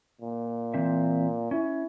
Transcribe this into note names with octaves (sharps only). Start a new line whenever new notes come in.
A#2
E3 C4 E5
C#4 E4